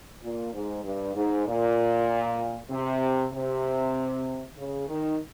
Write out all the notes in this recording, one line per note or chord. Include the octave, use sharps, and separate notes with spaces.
A#2
G#2
G2
G#2
A#2
C3
C3
C#3
D#3